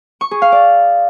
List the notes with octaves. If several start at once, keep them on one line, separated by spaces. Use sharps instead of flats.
C#6
G#4
F5
D5